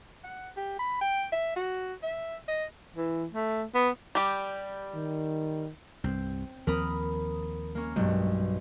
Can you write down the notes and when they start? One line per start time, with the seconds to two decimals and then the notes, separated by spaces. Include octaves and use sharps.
0.24 F#5
0.57 G4
0.79 B5
1.01 G5
1.32 E5
1.56 F#4
2.03 E5
2.48 D#5
2.96 E3
3.33 A3
3.75 B3
4.15 G3 G4
4.94 D#3
6.04 C2 G2 C4
6.67 D#2 F3 C4 A#4 B5 D#6
7.75 A#3 C#4
7.96 B1 G2 G#3